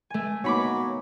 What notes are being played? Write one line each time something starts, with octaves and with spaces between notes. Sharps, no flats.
A3 G#5
F#3 A#3 B3 D#4 C#5 B5 D6